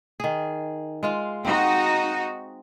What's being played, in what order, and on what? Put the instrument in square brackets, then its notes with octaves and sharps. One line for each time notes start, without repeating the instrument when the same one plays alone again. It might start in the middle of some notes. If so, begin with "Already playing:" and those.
[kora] D#3 G#4
G#3 F4 F5
[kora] C4 [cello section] D#4 F#4